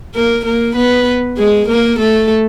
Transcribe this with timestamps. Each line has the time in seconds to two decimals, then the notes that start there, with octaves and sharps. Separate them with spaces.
0.15 A#3 A#4
0.45 A#3 A#4
0.76 B3 B4
1.37 G#3 G#4
1.68 A#3 A#4
1.99 A3 A4